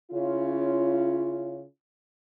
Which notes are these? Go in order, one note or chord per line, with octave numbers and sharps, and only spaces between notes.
C#3 C#4 E4 F4